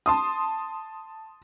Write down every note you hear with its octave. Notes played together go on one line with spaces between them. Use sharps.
A5 C6 D#6